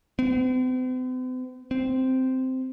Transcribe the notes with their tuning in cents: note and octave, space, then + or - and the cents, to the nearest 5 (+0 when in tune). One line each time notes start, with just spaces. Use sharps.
C4 -45
C4 -10